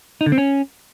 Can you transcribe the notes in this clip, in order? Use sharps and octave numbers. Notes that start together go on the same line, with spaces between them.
D#4
D3
C4
C#4